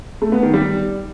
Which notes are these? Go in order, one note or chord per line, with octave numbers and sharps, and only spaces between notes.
A3
B3
D#3
G3